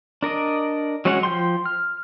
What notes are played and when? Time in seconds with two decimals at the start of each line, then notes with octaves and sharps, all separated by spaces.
0.23 D4 A#4 D5 D#5
1.05 F#3 G#3 C#4 C#5 F#5
1.23 F3 G5 C6
1.66 F6